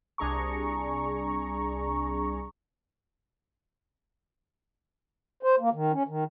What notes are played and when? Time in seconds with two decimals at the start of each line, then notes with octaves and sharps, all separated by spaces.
0.18 C2 D4 G#4 A#5 C#6
5.43 C5
5.60 A#3
5.73 D#3
5.93 C#4
6.08 D#3